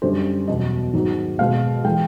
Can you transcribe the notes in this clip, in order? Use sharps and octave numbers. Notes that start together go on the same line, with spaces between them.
F#2 D3 G3 C5
E2 B2 F#3 D#5
G#2 D#3 F#3
B2 G#3 F5
E3 G#3 G5